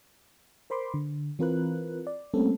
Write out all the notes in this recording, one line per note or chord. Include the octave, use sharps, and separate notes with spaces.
A#4 C5 B5 C6 D6
D3
E3 C4 F4 A#4 B4 F#6
D5
G3 A3 A#3 C4 C#4 A4